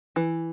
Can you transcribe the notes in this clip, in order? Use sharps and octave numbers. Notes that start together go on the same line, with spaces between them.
E3